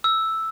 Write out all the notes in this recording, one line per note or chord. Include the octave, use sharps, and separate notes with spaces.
E6